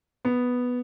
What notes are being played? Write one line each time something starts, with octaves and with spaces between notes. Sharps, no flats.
B3